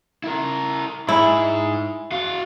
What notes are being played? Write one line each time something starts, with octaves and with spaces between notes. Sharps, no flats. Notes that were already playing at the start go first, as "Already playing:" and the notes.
E4 A#4
G#2 E4 G#4
F#4 F5